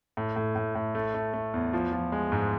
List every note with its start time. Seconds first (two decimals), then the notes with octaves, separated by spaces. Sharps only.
0.17 A2
0.36 A2
0.56 A2
0.75 A2
0.95 A3
1.14 A3
1.34 A3
1.54 E2
1.73 F3
1.93 F3
2.12 G#3
2.32 G#2